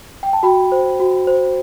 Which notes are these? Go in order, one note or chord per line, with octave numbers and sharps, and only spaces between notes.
G5
A5
F#4 G5 B5
C5
F#4
C5